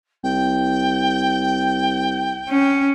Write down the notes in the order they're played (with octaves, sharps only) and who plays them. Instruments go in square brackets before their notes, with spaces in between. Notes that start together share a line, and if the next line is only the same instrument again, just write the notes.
[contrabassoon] C2 [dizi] G5
[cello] C#4